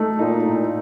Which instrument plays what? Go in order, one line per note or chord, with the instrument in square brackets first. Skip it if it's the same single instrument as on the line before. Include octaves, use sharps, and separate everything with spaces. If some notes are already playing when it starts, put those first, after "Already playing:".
Already playing: [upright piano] A3 D#4
[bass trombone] A#2 [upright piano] D#4
[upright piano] A2